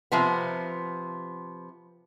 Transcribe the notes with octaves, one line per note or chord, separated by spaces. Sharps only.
C3 F3 B3